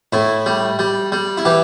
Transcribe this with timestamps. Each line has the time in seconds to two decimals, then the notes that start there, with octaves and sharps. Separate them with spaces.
0.13 A2 E4
0.46 G3
0.79 G3
1.12 G3
1.37 E4
1.45 E3 G4